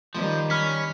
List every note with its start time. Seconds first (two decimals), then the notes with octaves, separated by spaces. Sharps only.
0.15 D#3 F3 G3
0.50 C#4 B5 F6 B6